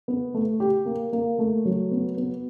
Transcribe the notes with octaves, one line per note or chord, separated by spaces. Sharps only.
B3
A3
G4
A#3
A#3
A3
F#3
B3
B3